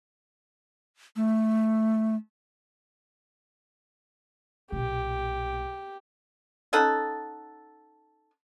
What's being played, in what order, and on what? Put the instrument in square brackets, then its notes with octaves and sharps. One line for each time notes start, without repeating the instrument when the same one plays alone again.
[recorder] A3
[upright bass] B1 A#2 [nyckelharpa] G4
[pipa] C#4 D#4 A4 F#5